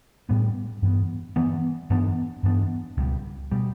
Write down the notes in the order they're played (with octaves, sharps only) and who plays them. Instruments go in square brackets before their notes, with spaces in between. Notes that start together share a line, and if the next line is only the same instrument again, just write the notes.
[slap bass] A2 G3 B3 D4
G2 E3 B3
G2 E3 B3
G2 E3 B3 D4
G2 E3 B3 D4
C#2 B2 G3
B2 G3